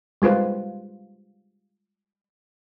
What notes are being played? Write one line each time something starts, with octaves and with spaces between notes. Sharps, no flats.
G3 G#3 F4 B4 C5